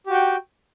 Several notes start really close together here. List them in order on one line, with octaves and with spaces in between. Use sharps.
G4 F#4 G5